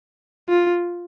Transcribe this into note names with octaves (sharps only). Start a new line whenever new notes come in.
F4